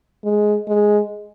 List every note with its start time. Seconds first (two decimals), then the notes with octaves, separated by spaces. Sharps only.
0.24 G#3
0.68 G#3